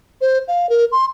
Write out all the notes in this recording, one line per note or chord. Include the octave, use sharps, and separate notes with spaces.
C5
F5
A#4
C6